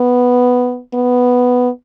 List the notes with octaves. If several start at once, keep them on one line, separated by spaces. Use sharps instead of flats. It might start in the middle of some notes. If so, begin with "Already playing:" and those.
Already playing: B3
B3